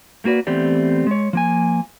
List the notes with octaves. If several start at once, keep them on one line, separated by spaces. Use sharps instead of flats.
A3 A#3 F#4 B4 D5
E3 A3 B3 C4 G4 D5
G#3 C#5
F3 A#3 G#5